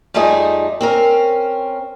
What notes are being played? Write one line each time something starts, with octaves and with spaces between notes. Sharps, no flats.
F2 G3 A3 D#4 G#4
C4 C#4 A#4